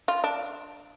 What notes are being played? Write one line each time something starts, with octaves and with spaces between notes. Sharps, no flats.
F4
D4